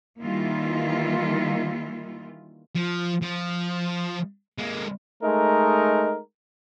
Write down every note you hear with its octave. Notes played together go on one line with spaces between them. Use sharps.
D#3 E3 G3 A#3 E4 F4
F3
F3
G#3 A#3
G#3 A3 D#4 A#4